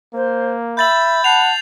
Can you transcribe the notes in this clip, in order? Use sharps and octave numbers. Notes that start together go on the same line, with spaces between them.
A#3 C5
E5 B5 G6 A6 F#7
F#5 A5 C7 F7